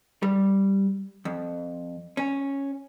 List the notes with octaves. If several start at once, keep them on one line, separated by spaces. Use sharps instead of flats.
G3
F2
C#4